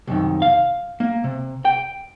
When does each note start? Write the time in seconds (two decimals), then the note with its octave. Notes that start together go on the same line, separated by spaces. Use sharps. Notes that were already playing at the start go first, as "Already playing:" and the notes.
0.07 C2 F#2 D#3
0.42 F5
1.00 A#3
1.24 C3
1.65 G5